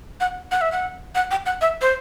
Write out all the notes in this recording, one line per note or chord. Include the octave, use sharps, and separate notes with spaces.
F#5
F#5
E5
F#5
F#5
G5
F#5
E5
C5